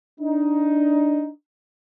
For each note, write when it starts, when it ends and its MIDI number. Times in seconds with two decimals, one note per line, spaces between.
0.21 1.31 62
0.21 1.31 63